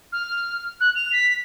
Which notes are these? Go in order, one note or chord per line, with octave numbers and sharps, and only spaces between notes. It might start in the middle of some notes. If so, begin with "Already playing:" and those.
F6
F#6
F7
B6